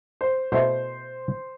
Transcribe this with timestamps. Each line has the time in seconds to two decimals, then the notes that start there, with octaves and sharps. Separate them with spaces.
0.21 C5
0.52 B2 A3 E4 C5